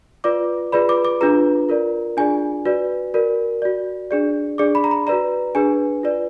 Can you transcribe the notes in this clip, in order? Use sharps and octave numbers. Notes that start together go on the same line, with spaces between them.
F4 B4 D5 D6
F4 G#4 B4 D5 B5
D6
D6
D4 F4 G#4 B4 A#5
F4 A#4 D5
D4 F4 G#4 D5 G#5
F#4 B4 D5
F#4 A#4 D5
F#4 D5
D4 G#4 D5
D4 G#4 D5 D6
B5
A#5
B5
F#4 B4 D5 A#5
D4 G#4 B4 G#5
F4 B4 D5